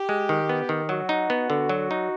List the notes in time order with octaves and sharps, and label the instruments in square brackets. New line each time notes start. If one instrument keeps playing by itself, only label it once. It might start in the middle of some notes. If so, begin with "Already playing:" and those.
Already playing: [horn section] G4
[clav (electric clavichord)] G#3
D#3
B3
D#3
[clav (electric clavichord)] F#3 [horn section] F#4
[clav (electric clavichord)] D#4
B3
D3
F#3
D#4